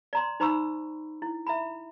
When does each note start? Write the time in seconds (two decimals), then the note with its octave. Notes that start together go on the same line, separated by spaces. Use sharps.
0.13 D5 A#5 C6
0.40 D#4 C5 A#5 B5 C#6 E6
1.22 E4
1.47 E5 A#5 B5